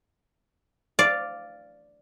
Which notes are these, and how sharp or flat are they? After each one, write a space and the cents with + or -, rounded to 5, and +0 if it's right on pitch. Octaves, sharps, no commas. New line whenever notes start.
D5 +0 F5 +0